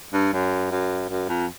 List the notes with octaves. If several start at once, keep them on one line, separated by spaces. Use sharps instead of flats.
G2
F#2
F#2
F#2
F2